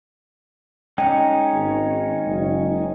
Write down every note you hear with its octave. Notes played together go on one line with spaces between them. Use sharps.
G#3 C#4 D#4 G5 C#7
G#1
F#1